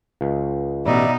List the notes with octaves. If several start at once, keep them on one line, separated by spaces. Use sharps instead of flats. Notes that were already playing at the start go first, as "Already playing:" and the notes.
C#2
A1 B2 D#4 D5 E5